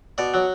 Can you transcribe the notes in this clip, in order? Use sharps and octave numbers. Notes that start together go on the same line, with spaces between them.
B2 D5
F#3